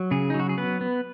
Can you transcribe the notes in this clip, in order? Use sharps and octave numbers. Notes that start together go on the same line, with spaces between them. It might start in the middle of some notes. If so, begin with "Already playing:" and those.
Already playing: F#3
C#3 G#4
D#4
F#3
F#4
G#4
B3 B4
B3